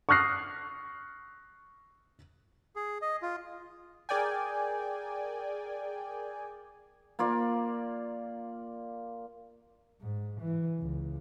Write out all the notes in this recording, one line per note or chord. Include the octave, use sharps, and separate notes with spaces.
C#6 D#6 F6 F#6 A#6 C7
G#4
D#5
F4
G#4 A#4 D5 G5 G#5
A#3 F4 D5
G#2
E3
C#2